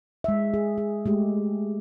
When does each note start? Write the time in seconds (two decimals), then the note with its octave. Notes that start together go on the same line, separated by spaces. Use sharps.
0.24 G#3 E5
0.54 G#4
0.78 G#4
1.06 G#3 A3 G4